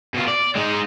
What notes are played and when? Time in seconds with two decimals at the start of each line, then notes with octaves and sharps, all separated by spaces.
0.14 B2 F4
0.28 D5
0.56 G#3 D#4